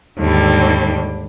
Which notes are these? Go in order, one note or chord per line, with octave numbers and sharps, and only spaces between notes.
D#2 G#2 D3 G3